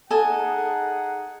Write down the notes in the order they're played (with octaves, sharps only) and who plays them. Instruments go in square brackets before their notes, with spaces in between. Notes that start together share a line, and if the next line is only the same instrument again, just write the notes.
[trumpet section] D#4 G#4 F#5 [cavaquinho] A4 D#5 G#5